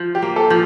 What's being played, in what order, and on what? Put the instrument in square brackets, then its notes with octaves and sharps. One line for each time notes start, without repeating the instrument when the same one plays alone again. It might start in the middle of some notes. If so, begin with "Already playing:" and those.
Already playing: [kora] F3
[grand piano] G4
[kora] A#3
[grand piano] A4
[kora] F3